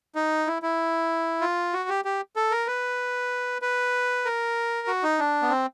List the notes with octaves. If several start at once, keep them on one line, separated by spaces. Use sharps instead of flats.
D#4
E4
E4
F4
F#4
G4
G4
A4
A#4
B4
B4
A#4
F#4
D#4
D4
B3
C4